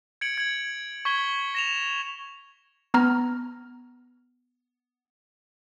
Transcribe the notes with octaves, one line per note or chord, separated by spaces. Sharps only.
G#6 C#7 D7 F#7
G#6 F#7
C#6 G#6 B6 G7
A#6 E7 F7
B3 A#5 F6